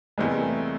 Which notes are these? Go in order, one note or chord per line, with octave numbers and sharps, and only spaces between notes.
E2 C3 E3 G3 G#3 A#3
A3